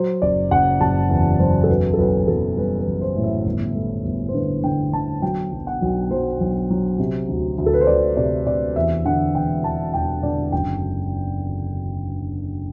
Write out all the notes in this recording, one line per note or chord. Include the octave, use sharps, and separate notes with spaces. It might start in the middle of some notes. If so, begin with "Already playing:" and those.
Already playing: F#3 C5
F#1 D5
F#1 F#5
F#1 A5
E2
F#3 C5
A4
B1 B4
A4
B1 B4
B1 A4
G3 B4
B4
B1
C5
A2
E5
G1
A3
G1
C5
D3 B4
D3 G5
D3 A5
F#3 G5
B1
F#5
B1
F#3 C5
B1
F#3
C3
D2
D2
A4
B4
C5
D2 D5
C3 D5
C3 D5
E2 E5
D3 F#5
E1 G5
E2 A5
E1 G5
D3 D5
F#1 G5